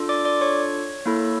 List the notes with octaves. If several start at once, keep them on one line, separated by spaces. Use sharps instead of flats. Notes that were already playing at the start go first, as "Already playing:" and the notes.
Already playing: D4 F4 A4
D5 D6
D5 D6
C#5 C#6
A#3 E4 A4